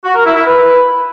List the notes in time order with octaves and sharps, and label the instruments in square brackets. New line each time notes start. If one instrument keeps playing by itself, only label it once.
[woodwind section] F#4
A#4
E4
E4
B4